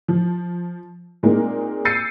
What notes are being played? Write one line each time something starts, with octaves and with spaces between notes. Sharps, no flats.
F3
A#2 G#3 A#3 C4 D#4
E6 G6 A6 C7 C#7 D#7